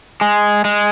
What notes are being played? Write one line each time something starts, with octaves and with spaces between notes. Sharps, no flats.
G#3
G#3